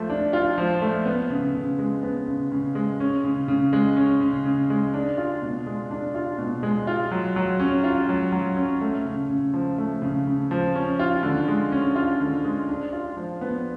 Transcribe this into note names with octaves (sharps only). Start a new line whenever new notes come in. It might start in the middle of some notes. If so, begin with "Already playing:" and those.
Already playing: F3 A3 F4
D4
F4
F3
A3
B3
C#3
C#3
G#3
B3
C#3
C#3
G#3
C#4
C#3
C#3
G#3
C#4
C#3
C#3
G#3
D4
F4
B2
G#3
D4
F4
B2
G#3
F4
F#3
F#3
C#4
F4
F#3
F#3
C#4
A3
C#3
C#3
F3
A3
C#3
C#3
F3
C#4
F4
D3
G#3
C#4
F4
D3
G#3
D4
F4
F3
B3